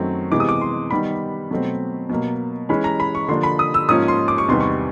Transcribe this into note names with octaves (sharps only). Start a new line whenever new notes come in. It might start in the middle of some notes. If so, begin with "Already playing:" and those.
Already playing: F#2 D#3 F#3 A3 C4
C3 E3 G#3 B3 D6
D#6
D6
C6
D#3 G3 B3 B5
B2 F#3 A3 C4
B2 F#3 A#3
E3 G#3 C#4 B5
A#5
B5
C#6
D3 F3 A#3 D4 C6
B5
D#6
E6
G#2 F3 A#3 C#4 F4 D#6
C6
D6
C#6
E2 C3 D#3 G3 B3 C6
C#6